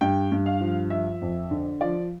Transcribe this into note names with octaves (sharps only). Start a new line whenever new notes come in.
G2 G5
G2
F5
F3
F3 E5
F2
D3
F3 D5